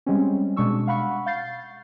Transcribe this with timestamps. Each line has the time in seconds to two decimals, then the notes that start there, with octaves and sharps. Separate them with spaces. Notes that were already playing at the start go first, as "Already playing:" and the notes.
0.06 G3 G#3 C4 C#4
0.56 B2 G#3 D4 C#6 E6
0.87 F5 F#5 B5 C#6
1.26 F5 G6 A6 C7